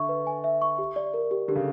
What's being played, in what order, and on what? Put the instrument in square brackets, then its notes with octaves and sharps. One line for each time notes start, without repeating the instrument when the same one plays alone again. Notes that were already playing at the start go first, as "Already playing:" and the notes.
Already playing: [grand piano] D3 [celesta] E5 C#6
[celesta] B4
G#5
E5
C#6
G4
D5
A#4
G4
[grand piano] D3 [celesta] G4
[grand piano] C#3